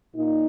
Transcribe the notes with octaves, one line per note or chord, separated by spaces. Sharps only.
A#2 D#4